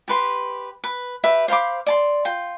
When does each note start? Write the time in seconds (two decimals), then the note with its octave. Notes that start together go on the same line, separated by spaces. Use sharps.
0.08 G4 B4 C6
0.84 B4
1.24 G4 B4 E5
1.48 C5 F5 B5 D6
1.86 D5 A5 C6
2.25 F4 G5